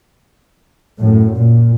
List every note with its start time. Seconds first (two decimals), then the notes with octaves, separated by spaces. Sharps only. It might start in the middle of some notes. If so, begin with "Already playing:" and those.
0.98 F#2 A2
1.35 A#2